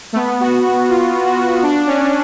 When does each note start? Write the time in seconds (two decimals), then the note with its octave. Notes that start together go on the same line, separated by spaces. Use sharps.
0.13 A3
0.16 B3
0.40 F#4
0.65 F#4
0.90 F4
1.26 F#4
1.63 D4
1.87 C#4